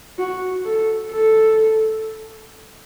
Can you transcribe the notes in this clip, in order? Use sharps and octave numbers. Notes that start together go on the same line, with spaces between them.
F#4
A4
A4